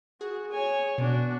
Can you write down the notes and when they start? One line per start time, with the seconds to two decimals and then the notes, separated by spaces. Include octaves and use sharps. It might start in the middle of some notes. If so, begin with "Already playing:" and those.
0.21 F#4 G#4
0.52 C#5 G#5
0.98 B2 D4 F#4